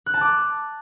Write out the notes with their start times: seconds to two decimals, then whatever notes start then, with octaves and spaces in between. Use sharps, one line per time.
0.06 F#6
0.14 A5
0.21 D6